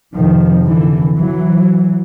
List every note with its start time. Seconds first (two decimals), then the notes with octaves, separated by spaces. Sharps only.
0.14 F2 C3 D#3 F3
0.65 D3 E3
1.17 E3 F#3